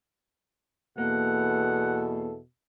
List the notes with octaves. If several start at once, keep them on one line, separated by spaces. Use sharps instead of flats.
E2 B2 A#3 E4 A4 F#5